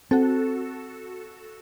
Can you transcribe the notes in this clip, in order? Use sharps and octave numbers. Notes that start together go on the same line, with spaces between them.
C4 F#4 A4